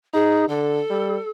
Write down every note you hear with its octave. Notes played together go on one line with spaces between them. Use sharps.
D#4 G#4
D3 A4
G3